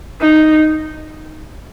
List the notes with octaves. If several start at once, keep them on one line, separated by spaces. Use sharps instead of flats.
D#4